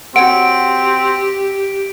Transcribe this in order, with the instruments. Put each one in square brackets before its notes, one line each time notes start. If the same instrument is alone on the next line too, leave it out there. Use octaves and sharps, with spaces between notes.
[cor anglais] C4 [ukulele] F#4 C#5 F#5 [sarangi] G4 [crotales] D7